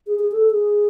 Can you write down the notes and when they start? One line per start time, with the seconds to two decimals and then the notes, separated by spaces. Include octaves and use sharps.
0.07 G#4
0.19 G#4
0.32 A4
0.51 G#4